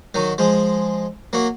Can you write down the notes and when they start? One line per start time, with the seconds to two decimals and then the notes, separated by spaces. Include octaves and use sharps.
0.14 D#3 F#3
0.38 F3 G#3
1.33 F#3 A#3